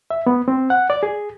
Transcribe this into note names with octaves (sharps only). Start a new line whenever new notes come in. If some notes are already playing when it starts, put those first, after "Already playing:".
E5
B3
C4
F#5
D5
G#4